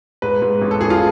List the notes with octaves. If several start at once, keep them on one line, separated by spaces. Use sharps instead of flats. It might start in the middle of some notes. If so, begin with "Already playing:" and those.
G#2 B4
G#2
A1
A4
A1 G#4
F4